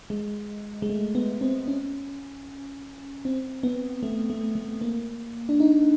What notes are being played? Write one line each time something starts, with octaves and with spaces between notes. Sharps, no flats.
G#3
G#3
A3
B3
C4
C#4
C4
B3
A3
A3
A3
A#3
D4
D#4